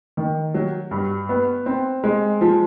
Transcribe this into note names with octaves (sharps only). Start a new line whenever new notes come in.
D#3
F#3
G2
B3
C4
G#3
F3